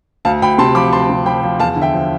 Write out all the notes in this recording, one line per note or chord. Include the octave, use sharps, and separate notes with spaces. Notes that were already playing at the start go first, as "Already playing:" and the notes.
D2 F5 A5
D2 G5 B5
C3 A5 C6
F3 B5 D6
D2 A5 C6
C3
F3 G5 B5
F3
E2 F5 A5
D3
E5 G5
F3